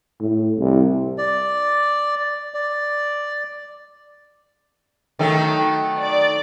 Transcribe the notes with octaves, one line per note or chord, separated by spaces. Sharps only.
A2
C2
D5
D5
D#3 F#3 A3
D5